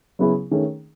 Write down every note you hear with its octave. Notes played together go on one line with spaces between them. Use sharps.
C#3 F#3 B3 E4 G#4
D#3 A3 C#4 G#4